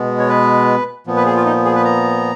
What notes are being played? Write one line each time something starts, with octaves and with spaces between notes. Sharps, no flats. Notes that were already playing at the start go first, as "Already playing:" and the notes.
Already playing: B2 G#3 B3
C#5
B4
A#2 F3 B3
B4
G#4
F4
D#4
G#4
B4
A#5